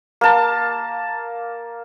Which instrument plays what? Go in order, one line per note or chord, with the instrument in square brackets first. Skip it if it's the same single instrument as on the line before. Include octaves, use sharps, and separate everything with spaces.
[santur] A#3 A5